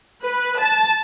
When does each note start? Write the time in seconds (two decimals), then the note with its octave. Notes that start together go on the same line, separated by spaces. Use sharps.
0.22 B4
0.60 A5